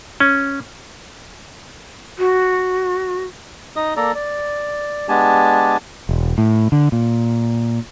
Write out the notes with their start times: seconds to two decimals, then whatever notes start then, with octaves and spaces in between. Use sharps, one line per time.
0.20 C#4
2.18 F#4
3.76 D#4 D#5 D#6
3.97 A#3 A4 D5 A#5
4.15 D5
5.09 G#3 B3 D4 G4 G#5 A5
6.09 E1
6.38 A2
6.72 D3
6.92 A#2